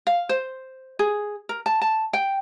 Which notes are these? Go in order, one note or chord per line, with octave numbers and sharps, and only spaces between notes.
F5
C5
G#4
A#4
A5
A5
G5